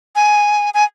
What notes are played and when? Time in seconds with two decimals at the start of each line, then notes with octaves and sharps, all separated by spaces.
0.16 G#5
0.74 G#5